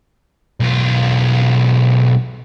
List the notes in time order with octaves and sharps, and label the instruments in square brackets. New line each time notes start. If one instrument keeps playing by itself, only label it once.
[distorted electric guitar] B1 F4